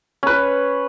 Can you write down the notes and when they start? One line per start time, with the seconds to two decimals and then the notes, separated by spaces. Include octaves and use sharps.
0.23 C#4 B4